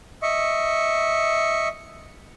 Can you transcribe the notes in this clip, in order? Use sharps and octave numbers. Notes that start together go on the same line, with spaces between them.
D#5 E5 C#6